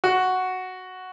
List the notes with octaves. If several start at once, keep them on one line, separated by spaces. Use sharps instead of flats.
F#4